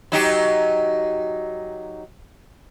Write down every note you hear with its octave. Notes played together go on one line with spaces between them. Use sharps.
F#3 D#4 G4